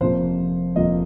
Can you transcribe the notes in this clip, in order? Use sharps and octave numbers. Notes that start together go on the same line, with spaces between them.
F1 F2 C3 F3 A#3 C5
F1 F2 C3 F3 A#3 D#5